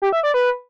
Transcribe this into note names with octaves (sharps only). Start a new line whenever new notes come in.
G4
E5
D5
B4